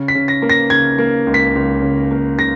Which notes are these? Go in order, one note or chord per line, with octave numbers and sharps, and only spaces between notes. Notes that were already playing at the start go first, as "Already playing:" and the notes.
Already playing: C#3
B6
C#3
A#6
A#3
A#6
C#3 G#6
A#3
C#2
B6
C#2
C#3
A#3
C#3 A#6